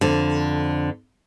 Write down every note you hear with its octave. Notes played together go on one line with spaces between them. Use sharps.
F2 D3